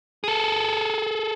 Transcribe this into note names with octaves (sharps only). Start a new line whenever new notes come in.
G#4 A4